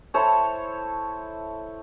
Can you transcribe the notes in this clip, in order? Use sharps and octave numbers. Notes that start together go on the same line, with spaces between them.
E4 A4 C5 C#5